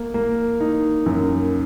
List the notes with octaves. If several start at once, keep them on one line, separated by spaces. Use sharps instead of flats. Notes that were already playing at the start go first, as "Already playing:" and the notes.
Already playing: A#3
A#3
D#4
F#2